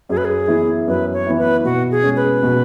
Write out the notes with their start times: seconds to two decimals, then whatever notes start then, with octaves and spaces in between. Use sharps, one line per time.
0.09 F#2 G#4
0.17 B4
0.25 G#4
0.48 E3 B3 E4
0.88 F#2 B4
1.13 C#5
1.26 E3 B3 E4
1.38 B4
1.64 B2 F#4
1.91 G#4
2.03 G#3 C#4
2.16 B4
2.43 B2